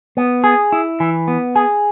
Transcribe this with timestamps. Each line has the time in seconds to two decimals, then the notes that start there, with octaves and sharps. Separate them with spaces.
0.17 B3
0.44 G#4
0.72 E4
1.00 E3
1.28 B3
1.56 G#4